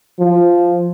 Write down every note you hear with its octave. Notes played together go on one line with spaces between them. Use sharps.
F3